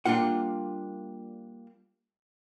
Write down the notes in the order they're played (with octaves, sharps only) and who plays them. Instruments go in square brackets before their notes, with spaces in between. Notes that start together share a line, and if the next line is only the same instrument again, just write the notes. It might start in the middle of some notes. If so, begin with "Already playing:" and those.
[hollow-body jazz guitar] G3 A#3 D4 F4 F#5